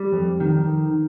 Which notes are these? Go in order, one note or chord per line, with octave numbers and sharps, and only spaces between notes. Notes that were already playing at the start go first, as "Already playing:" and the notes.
Already playing: G3
F2
D#3